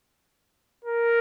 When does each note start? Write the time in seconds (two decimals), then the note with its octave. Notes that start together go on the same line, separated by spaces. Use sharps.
0.85 A#4